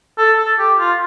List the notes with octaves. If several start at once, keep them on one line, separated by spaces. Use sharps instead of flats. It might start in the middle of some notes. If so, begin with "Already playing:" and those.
A4
A4
G4
F4